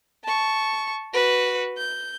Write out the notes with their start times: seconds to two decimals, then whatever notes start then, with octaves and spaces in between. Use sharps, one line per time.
0.24 A5 C#6
1.13 F#4 B4
1.77 G6